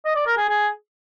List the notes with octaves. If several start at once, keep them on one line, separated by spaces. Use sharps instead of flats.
D#5
D5
A#4
G#4
G#4